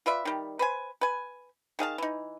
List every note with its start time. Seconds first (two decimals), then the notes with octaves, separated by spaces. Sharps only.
0.06 F4 B4 D5 E5
0.25 D#3 G3
0.59 B4 C5 G#5
1.01 B4 G#5
1.79 D#3 G#4 F5 A5
1.98 E3 D#4